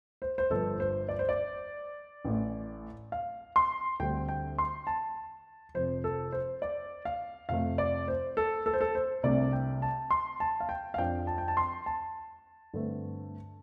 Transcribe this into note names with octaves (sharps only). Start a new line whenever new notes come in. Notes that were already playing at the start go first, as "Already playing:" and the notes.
C5
C5
G1 G2 F3 A4
C5
D5
C5
D5
A1 A2 A3
F5
C6
D2 D3 G3 C4 G5
G5
C6
A5
F1 F2 F3 C5
A4
C5
D5
F5
F2 C3 A3 F5
D5
C5
A4
A4
C5
A4
C5
C2 C3 A3 D4 D5
G5
A5
C6
A5
F5
G5
F5
F2 F3 D4 G5
A5
G5
A5
C6
A5
G2 D3 A3 C4